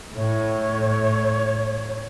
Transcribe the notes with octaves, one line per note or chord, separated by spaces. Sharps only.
A2 C#5